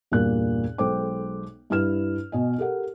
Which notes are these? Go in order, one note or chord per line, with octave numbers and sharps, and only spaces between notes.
E2 G2 A#2 A#3 F#6
B1 G#3 A4 C5 G5 D6
G2 E4 B4 F6 E7
B2 D#5 G#5
G4 A4 A#4 F#5